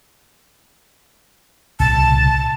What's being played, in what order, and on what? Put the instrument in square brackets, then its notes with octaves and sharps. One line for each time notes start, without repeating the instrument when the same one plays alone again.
[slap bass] C2 A#2 C#3 [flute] A5